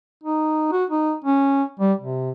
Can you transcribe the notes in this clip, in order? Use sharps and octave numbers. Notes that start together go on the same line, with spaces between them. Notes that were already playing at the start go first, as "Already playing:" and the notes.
D#4
F#4
D#4
C#4
G3
C3